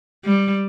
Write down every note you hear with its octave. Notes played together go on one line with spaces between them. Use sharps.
G3